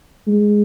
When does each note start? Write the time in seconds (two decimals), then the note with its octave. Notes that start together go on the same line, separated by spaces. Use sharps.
0.27 G#3